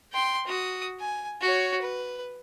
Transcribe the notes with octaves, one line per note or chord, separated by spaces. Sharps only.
G5 C6
F#4 D#6
G#5
F#4 C#5
B4